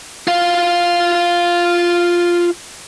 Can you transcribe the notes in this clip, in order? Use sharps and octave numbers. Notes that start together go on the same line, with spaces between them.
F4 F5